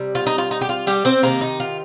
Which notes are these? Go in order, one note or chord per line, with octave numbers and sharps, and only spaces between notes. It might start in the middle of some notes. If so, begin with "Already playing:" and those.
Already playing: C3 G3
F4
D#4
F4
D#4
G4
F4
G3 G4
C4 C5
C3 D#3 A#3 A#4
D#4
F4